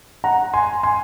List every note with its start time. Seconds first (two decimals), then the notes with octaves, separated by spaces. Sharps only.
0.24 F#5 A#5
0.54 G#5 C6
0.83 G#5 C6